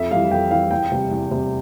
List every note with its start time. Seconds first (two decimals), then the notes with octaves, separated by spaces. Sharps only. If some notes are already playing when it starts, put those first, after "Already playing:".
Already playing: F2 E5
0.11 E3 G3 F5
0.31 F2 G5
0.51 E3 G3 F5
0.71 E2 G5
0.92 C3 G3
1.11 E2
1.31 C3 G3